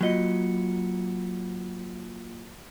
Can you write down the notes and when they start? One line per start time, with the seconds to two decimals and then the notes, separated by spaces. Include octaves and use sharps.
0.01 F#3 A#3 F4 D#5 C#7